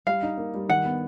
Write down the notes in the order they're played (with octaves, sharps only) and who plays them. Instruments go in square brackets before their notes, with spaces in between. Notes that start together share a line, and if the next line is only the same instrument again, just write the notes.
[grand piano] G3 [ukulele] F5
[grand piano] D#4
A#3
G3
[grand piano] D#3 [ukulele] F#5
[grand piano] B3